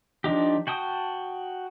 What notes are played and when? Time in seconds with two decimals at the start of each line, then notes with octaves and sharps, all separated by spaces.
0.24 F3 D4 D#4 G4
0.67 F#4 G5 A5 D#6